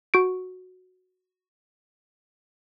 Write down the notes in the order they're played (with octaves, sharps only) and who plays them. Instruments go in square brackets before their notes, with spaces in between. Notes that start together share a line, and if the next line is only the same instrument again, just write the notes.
[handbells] F#4 D7